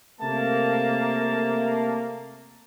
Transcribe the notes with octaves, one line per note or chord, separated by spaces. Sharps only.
C3 A3 A#3 A5